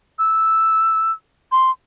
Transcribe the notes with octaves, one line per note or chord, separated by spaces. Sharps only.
E6
C6